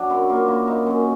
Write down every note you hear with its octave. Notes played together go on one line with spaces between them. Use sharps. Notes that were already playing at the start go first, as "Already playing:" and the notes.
Already playing: F#3 D4
F#2 E4
A#3 F4
A#3 E4
A#3 D#4
F#2 C#4